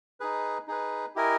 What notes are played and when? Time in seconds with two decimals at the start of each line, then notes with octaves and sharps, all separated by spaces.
0.20 D#4 G#4 B4
0.67 D#4 G#4 B4
1.16 E4 G4 A#4 D#5 G#5